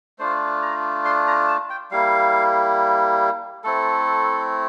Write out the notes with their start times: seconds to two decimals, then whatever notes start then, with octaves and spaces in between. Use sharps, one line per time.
0.19 A3 D4 F4 C5
0.62 A#5
1.05 C6
1.27 A#5
1.48 A5
1.70 G5
1.91 G3 A#3 E4 F5
3.64 A3 C4 E4 A4